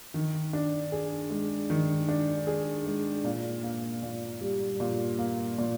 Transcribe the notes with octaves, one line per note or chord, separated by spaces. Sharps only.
D#3
D4
G#4
G#3
D#3
D4
G#4
G#3
A#2
A#3
A#2
G3
A#2
A#3
A#2